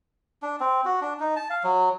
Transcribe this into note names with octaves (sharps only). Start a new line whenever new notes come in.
D4
C4
F#4
D4
D#4
A5
F5
F#3